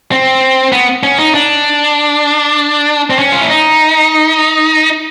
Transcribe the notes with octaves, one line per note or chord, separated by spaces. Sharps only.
C4
B3
C#4
D#4
D4
C4
C#4
F4
E4
D#4